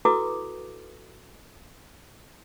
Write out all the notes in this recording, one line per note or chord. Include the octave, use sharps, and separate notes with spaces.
E4 F#4 A4 B4 D6 D#6